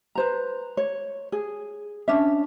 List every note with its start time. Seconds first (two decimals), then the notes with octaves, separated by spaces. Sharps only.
0.15 B4 C5 A#5
0.77 C#5
1.32 G#4
2.08 C#4 D4 E5